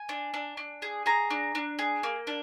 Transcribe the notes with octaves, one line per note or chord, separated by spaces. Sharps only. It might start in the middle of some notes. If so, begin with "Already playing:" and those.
Already playing: G#5
D4
D4
D4
G#4
G#4 A#5
D4
D4
G#4
A#3
D4